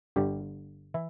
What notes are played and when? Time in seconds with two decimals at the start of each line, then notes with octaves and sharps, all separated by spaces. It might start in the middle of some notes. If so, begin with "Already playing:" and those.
0.16 G1 G2 D3 G4
0.94 E3 E4